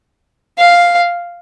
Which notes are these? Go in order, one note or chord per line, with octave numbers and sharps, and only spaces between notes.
F5